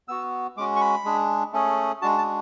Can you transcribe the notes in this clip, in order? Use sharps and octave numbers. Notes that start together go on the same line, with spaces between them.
B3 F#4 E6
G#3 C#4 F#4 D6
C#6
B5
G#3 D4 G#4
A3 C#4 G#4
G#3 D4 F#4 A5
A5